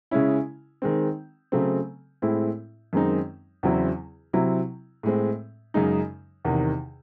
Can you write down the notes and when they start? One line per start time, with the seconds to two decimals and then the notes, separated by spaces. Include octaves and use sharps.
0.11 C#3 G#3 C#4 E4
0.82 D#3 G#3 C4
1.52 C#3 F#3 A3 C4
2.22 A2 G#3 C4 E4
2.93 F#2 D#3 G#3 C4 D#4
3.63 E2 C#3 F#3 C4 E4
4.33 C3 F#3 C4 E4
5.03 A2 G#3 C4
5.74 F#2 C#3 G#3 D#4
6.45 E2 C3 D#3